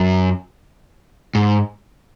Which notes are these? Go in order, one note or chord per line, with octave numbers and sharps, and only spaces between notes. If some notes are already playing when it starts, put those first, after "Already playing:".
Already playing: F#2
G#2